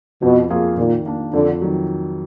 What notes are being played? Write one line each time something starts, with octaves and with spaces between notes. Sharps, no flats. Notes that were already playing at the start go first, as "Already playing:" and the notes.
F2 B2
F3 A#3 F4 G#4
A#2 D#3
A#3 D4
F2 D3
D#3 F#3